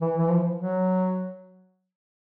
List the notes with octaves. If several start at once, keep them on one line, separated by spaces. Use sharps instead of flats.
E3
E3
F3
F#3